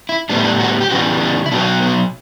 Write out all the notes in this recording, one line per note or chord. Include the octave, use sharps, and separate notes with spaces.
E4
A2 G3 B3 D4
E4
D4
F#4
G4
C#3 E3 G3 B3 F#4
D4
E4
B2 F#3 B3 D4
B3